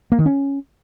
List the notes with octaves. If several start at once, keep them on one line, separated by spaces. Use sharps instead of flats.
A#3
D#3
C#4